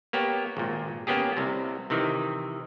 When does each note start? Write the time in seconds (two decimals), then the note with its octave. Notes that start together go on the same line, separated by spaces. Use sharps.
0.13 A#3 B3 G4 C#5
0.57 G#1 A#2
1.07 A#3 B3 C#4 G4 G#4
1.37 C2 C3
1.90 C3 D#3 E3